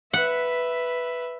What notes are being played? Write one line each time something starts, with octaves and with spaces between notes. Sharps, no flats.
B4 E5 F#5